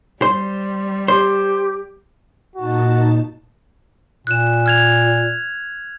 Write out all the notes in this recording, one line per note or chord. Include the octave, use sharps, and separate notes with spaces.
G3 C5
G4 C5
A#2 D#4 F#4 A5
A#2 F#6 E7
F6 G#6 F7